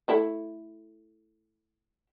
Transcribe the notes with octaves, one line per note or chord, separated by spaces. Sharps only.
A3 E4 A4